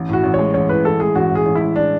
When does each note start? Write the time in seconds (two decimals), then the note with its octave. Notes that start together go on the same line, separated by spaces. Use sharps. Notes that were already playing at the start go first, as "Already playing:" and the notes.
Already playing: A1
0.09 A2 F#4
0.23 A1
0.34 G#3 C#5
0.54 A1 C#5
0.69 A2 B4
0.85 A1 A4
1.00 G#3 G#4
1.15 A1 F#4
1.30 A2
1.35 G#4
1.46 A1
1.55 E4
1.61 G#3
1.76 D4